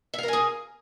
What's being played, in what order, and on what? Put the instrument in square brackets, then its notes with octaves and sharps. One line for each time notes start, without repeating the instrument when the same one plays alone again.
[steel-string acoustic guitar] E5
F5
A#4
G#5
G#4